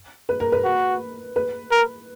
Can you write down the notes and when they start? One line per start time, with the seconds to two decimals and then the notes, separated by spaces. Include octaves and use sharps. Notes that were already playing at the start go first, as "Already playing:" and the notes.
0.29 B4
0.40 A#4
0.52 B4
0.64 F#4
1.36 B4
1.71 A#4